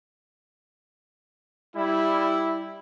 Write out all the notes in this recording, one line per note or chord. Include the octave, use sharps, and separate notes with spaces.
G3 E4